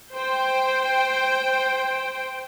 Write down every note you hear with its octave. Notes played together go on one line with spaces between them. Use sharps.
C5 G5